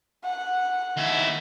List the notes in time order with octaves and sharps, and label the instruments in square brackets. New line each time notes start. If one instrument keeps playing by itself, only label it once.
[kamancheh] F#5
[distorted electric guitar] D#2 E4